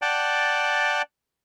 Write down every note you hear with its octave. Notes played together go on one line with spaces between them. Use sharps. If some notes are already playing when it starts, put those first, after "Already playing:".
D5 F#5 G5 A5